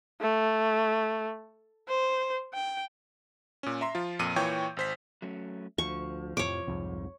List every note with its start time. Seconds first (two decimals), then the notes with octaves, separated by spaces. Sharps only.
0.21 A3
1.88 C5
2.54 G5
3.63 A#2 C#4
3.81 E5 A#5 C6
3.95 F3 F4
4.19 F2 A#2 D#7
4.36 A#2 E3 C#5 G5 C#6 G6
4.77 G#1 C5 B6
5.22 F#3 A3 C#4
5.78 D2 F3 C#6
6.37 F2 A2 C3 C#5 D6
6.67 C2 F2 G#2